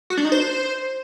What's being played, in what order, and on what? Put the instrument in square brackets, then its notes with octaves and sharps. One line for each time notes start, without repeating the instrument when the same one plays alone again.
[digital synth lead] F#4
D4
D#4
C5